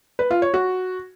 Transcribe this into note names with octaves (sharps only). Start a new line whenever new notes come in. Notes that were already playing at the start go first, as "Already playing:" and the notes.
B4
F4
C#5
F#4